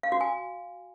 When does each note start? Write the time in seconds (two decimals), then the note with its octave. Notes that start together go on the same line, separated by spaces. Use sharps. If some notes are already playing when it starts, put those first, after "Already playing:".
0.03 F5
0.12 F#4
0.21 G#5